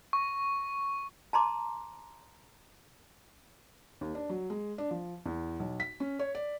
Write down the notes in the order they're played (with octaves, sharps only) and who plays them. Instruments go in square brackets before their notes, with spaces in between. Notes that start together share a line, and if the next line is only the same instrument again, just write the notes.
[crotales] C#6
[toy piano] A5 A#5 C6 D6
[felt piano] D#2
D4
F#3
G#3
D4
F3
E2
B1
B6
C#4
C#5
D5